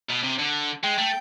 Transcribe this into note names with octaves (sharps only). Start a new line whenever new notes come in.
B2
C3
D3
G#3 G5
A3